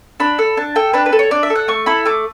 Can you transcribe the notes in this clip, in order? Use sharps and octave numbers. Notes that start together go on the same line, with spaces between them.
D4 B5
A4
D4 A5
A4 G5
D4 B4
B4
A4
C#5
D4 D5
E5
A4
F#5
A3 C#6
E4 A4 B5
A3 D6